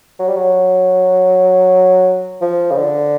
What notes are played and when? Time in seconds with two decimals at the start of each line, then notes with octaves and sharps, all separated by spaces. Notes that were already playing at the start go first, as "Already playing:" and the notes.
0.19 F#3
0.28 G3
0.36 F#3
2.41 F3
2.72 C#3
2.78 D3